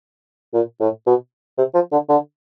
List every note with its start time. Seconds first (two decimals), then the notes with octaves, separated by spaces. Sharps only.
0.54 A#2
0.80 A2
1.06 B2
1.58 C3
1.74 F3
1.92 D3
2.09 D3